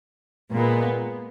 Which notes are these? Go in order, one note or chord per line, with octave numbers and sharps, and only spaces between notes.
A#2 G#3 B3